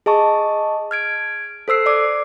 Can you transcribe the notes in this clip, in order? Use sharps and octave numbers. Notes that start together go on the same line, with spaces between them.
G#4 D#5 A5 C#6
F6 G#6 D7
A4 C5 E6 C7
D5 D6